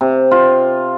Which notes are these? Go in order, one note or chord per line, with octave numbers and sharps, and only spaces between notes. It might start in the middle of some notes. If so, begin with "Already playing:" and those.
C3
F4